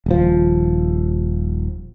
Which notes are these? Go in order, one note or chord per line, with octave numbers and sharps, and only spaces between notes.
D#1 F3